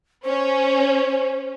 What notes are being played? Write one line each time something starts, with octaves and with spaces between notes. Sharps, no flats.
C#4 C5